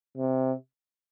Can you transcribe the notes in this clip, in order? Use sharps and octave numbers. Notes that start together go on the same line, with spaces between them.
C3